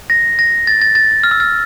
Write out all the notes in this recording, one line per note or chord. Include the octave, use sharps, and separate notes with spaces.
A#6
A#6
A6
A6
A6
F6
E6
F6